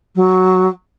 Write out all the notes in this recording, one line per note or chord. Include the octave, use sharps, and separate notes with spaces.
F#3